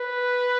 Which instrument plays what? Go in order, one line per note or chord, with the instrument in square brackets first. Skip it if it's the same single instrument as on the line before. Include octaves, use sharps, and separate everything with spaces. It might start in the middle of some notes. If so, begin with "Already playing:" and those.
Already playing: [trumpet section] B4